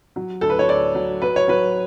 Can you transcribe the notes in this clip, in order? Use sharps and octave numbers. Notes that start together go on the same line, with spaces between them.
F#3
D2 A4
B4
C#5
D2 D5
F#3
F#3 B4
C#5
F#3 B4